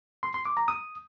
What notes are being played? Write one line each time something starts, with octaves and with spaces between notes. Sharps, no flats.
C6
C6
D6
A#5
D#6